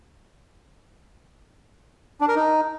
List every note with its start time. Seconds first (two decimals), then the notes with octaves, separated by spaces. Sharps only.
2.21 D4
2.28 A#4
2.35 D#4